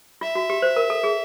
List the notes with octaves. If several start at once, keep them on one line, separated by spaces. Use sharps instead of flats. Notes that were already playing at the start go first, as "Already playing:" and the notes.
F4 E5
F#4
G4
C5
A#4
A4
G#4